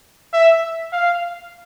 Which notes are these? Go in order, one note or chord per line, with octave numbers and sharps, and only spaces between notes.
E5
F5